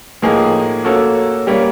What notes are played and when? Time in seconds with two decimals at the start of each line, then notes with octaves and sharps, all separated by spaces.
0.22 A2 F3 A#3 D#4 G#4
0.84 A#3 C#4 F#4 A4
1.47 G3 A#3 C#4